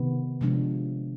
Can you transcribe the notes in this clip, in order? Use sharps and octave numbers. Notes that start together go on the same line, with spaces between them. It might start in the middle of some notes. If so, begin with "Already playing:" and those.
Already playing: C3 D#3 B3
C3 F3 G#3 D4